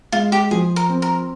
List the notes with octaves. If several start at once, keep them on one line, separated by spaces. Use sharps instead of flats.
G#3 F4
G4
F3 G#4
A#4
C4
A#4